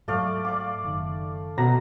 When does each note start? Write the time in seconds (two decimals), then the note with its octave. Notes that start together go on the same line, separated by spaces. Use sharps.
0.08 G#2 F#3 A3 D5 F5
0.45 D5 F5 D6
0.84 F#1 D#3
1.58 B2 A#5